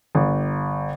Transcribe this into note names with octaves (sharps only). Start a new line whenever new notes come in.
G1